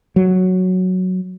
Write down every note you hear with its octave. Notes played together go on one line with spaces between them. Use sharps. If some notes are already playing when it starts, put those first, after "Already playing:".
F#3